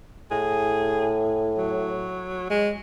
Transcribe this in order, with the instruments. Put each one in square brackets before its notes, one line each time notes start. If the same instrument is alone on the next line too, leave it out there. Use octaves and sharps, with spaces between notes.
[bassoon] A2 [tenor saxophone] G#4
[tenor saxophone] F#3
G#3